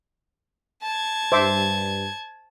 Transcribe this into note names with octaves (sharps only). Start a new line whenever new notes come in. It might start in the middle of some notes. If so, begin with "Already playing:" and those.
A5 G#6
G2 C5 E5 D6